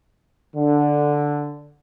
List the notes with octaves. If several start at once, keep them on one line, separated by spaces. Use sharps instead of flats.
D3